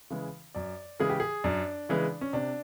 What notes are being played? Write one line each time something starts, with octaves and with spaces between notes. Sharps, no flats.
C#3 E3 G#3
F#2 D5
C#3 E3 G#3 G#4
G4
G#4
F#2 D4
C#3 E3 G#3
C#4
C3 D4